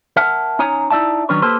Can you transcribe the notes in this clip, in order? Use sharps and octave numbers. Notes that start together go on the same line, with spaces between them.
A#4 E5 F#5 A5
C#4 D#4 C#5 G#5 A#5
D#4 E4 D5 E5 A5
D#3 F#3 C#4 D4 B4 C#5
A#3 G4 A4 B4 C5